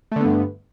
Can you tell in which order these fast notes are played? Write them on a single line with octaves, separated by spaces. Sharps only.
A3 D3 B3 G2